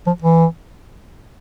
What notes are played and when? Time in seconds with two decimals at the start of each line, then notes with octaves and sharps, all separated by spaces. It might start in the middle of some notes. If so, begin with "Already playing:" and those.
0.07 F3
0.22 E3